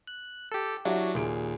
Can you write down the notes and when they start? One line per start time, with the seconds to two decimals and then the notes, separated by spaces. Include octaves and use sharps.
0.07 F#6
0.52 G4 A4
0.85 F#3 D4 E4 F#4 G4
1.15 D#2 A#2 G#4 D7